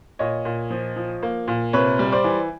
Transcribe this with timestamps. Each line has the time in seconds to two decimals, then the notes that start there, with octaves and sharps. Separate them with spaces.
0.19 A#2 C#5 D#5
0.45 A#2
0.70 F3
0.96 F3
1.23 A#3
1.48 A#2
1.73 C3 B4 C#5
1.99 G3
2.12 C5 D5
2.24 E3